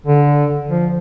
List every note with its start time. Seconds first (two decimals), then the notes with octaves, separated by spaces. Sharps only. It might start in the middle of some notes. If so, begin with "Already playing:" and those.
0.07 D3
0.69 F3